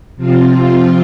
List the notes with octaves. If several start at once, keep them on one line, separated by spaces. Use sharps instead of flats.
C3 F3 C4 F4